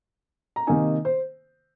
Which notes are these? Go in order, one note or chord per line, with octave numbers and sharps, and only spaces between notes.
A#5
C3 D#3 A#3 D#4 G#5
C5